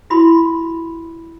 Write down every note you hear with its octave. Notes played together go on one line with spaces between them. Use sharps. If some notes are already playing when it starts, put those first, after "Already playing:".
E4 F#4 B5 C6